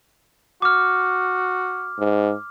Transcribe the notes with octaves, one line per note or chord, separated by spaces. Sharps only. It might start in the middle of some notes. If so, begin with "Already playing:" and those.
F#4 D6 F6
G#2